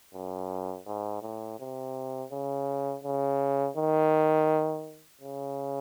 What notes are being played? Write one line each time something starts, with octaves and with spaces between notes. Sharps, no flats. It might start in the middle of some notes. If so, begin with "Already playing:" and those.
F#2
G#2
A2
C3
C#3
C#3
D#3
C#3